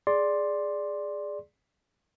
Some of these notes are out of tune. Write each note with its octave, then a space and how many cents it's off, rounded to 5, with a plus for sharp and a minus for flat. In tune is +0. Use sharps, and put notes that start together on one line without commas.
G#4 +0 D5 +0 C6 +10